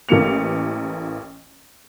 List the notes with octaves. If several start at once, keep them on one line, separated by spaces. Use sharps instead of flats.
A1 E3 A3 A#3 C#7 F7